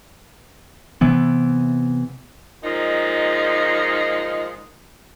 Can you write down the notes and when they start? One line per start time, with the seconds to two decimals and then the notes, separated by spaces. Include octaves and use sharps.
1.01 C3 E3 B3
2.64 A#2 F3 G#3 D#4